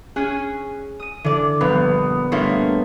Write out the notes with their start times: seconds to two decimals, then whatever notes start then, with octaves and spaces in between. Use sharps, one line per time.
0.16 C#4 G#4 F#6
1.00 D#6 D#7
1.24 D3 E3 D5
1.61 A#1 G2 B3
2.32 G2 A3 A#3 E4 C#5 C6